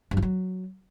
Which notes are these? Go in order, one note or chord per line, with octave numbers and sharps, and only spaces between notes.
G2
F3
F#3